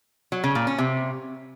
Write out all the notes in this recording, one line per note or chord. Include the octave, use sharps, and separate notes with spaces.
F#3
C#3
A#2
C#4
C3